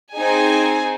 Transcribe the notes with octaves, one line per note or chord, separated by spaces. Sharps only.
C4 D#4 G#4 G#5